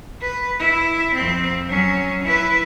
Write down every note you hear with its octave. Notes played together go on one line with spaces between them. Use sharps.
B4
E4
F2 C4
F#3 C#4
E4 B4